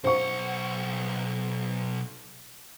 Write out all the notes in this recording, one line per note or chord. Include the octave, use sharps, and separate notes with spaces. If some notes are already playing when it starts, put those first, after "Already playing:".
B1 C5 F#5 C#6